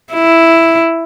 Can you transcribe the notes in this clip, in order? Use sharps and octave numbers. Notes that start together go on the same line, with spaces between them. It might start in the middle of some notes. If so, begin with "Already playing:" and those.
E4